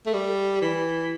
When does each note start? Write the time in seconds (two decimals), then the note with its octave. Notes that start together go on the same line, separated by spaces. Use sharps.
0.06 A3
0.14 G3
0.62 E3